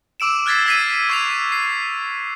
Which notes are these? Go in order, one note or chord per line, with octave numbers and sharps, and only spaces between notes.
D6 E6 D7 E7
F6 F#6 G#6 A6 B6 C7
E6 G#6 B6 C7 D#7
C#6 G#6 C7 D#7 F7
C7